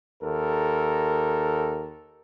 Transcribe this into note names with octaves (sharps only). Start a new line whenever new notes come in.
D#2 A4 A#4